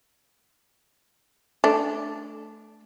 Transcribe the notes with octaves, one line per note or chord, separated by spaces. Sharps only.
A3 D4